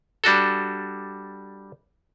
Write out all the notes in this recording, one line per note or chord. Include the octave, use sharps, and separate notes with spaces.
G3 D4 F#4 A4